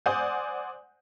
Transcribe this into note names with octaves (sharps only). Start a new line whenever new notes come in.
C5 D5 F#5 G#5 D#6 G6